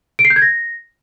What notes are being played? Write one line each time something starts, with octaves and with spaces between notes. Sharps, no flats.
D7
C7
G6
G#6
A#6